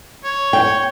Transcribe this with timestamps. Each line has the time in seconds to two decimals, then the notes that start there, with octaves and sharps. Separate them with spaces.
0.24 C#5
0.53 G5